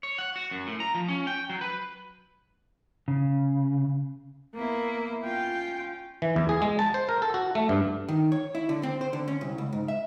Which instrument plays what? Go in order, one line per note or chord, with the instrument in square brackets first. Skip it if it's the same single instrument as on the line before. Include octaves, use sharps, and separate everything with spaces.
[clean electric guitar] C#5
F#5
F#4
F#2
A2
A#5
F3
C#4
G5
F#3
B4
[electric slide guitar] C#3
[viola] A#3 [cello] B3 E4
[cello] C#4 F4 [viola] G5
[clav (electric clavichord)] E3
E2
G#4
G#3
A5
C5
A#4
A4
F#4
A3
G2
[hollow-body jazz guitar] D#3
C#5
E4
D3
C4
C5
D3
C#4
C2
C#2
G#2
E5